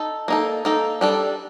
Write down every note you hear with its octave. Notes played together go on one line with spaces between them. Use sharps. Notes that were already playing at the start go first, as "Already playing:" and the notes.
Already playing: D#4 A4
A#3 D#4 A4
A#3 D#4 A4
G3 D4 A4